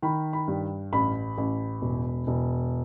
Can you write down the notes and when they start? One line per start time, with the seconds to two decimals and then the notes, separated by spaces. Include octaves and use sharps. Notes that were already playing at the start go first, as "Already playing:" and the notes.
0.02 D#3 B5
0.33 B5
0.48 G2
0.93 A1 B5
1.38 A1
1.81 E1
2.27 E1